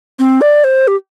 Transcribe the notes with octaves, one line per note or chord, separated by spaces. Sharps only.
C4
D5
C5
G4